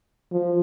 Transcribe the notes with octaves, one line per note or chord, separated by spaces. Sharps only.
F3